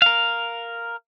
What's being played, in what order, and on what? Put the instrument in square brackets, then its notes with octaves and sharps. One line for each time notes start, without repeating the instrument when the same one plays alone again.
[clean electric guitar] A#4 F5